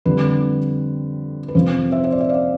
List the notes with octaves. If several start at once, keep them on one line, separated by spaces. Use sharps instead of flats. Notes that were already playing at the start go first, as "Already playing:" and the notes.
F2 D3 G3 B4
B4
F2 C3 F3 C5
C5 E5
C5
D5
E5
D5 F5